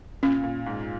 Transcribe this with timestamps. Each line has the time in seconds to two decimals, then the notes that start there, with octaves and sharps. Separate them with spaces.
0.23 A#2 C#4
0.44 A#2
0.66 G#2